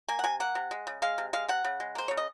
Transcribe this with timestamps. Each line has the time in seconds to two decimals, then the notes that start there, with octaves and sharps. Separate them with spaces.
0.08 A#3 G#5
0.19 F#5
0.24 C3 G#5
0.40 A#3 F#5
0.55 C3
0.71 G#3
0.87 C#3
1.02 G#3 F5
1.18 C3
1.33 G#3 F5
1.48 C3 F#5
1.64 C#3
1.80 G#3
1.95 A#3 C5
2.08 C#3 C#5
2.17 D#5